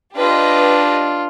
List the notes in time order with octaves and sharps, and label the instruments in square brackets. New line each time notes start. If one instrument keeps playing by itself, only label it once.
[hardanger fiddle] D4 [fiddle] F4 [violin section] G4 B4 D#5